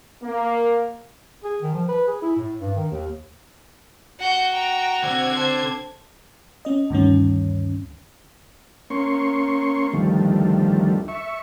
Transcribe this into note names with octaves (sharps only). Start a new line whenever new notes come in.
A#3
G#4
D#3
F3
B4
G#4
E4
A2
G2
D#3
D#2
F#4 F#5 G6
G5 A#5
D3 C4 G#6
C5 A5
C#4 D#5
D2 G2 D#3 C#4
A#3 C#4 C6 C#6
D2 D#3 F3 G3 A3
E5 C#6